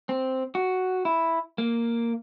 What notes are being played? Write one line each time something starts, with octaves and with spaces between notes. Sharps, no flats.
C4
F#4
E4
A#3